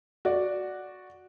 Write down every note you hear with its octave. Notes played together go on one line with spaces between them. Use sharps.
F#4 D5